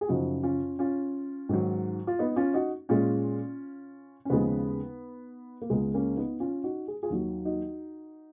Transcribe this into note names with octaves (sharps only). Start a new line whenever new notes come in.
G#4
F#2 C#3 F3 D#4 F#4
C#4 F4
C#4 F4
G#2 D#3 F#3
F4
B3 D#4
C#4 F4
D#4 F#4
A#2 G#3 C#4 F4
C#4
D#2 C#3 F3 G#3 B3 D#4
A#3
C#2 C#3 G#3 B3
A#3 C#4
B3 D#4
C#4 F4
D#4 F#4
G#4
F4 G#4
D#2 D#3 F#3
D#4 F#4